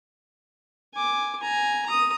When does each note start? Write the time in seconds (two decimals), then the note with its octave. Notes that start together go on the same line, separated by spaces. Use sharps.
0.94 G#5 D6
1.40 G#5 A#5
1.86 A#5 D#6